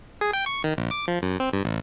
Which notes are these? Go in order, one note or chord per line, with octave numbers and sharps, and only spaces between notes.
G#4
G5
C#6
D#3
A#1
D6
F3
F#2
C4
G2
A1